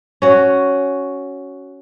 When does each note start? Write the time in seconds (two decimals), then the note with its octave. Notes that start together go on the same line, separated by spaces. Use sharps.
0.22 C#4 F#4